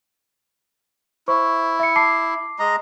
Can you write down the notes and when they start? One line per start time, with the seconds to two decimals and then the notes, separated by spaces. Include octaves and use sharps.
1.28 E4 C5 C#6
1.80 E5 C#7
1.96 A5 D6 C7
2.59 G#3 D#5 A#5